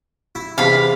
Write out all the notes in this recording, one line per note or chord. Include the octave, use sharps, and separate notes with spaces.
E4
E2 C3 F5 B5